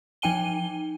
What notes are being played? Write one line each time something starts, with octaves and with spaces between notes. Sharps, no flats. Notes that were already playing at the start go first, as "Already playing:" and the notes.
F3 D#4 G5 G#5 D#7 G7